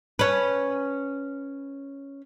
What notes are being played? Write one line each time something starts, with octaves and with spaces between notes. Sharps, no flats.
C#4 B4